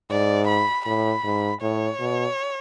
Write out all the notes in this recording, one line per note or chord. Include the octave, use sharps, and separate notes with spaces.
G#2 D5
B5
A2 B5
G#2
A2 C#5
B2